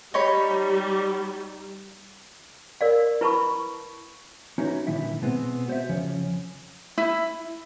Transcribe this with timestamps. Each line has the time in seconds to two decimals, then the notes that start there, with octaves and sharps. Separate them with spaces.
0.14 G3 D#4 C#5 B5
2.81 A#4 D5 F5
3.21 E4 B4 A5 B5 C#6
4.58 C#4 D#4 E4 F#4 B4 C#5
4.87 A#2 D3 D#3 G3 E4 E5
5.22 B2 G#3 B3 C4
5.68 F#4 C5 C#5 E5
5.89 F2 C#3 F3 C#4 C#5
6.98 E4